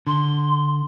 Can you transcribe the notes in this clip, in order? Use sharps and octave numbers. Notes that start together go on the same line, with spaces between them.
D3 C6